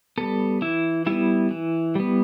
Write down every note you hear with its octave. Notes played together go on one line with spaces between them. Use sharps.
G3 B3 A4
E3 E4
G3 B3 E4
E3
G3 B3